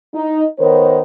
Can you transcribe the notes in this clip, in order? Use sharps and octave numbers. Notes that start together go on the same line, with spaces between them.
D#4
D#3 B3 A#4 C5 C#5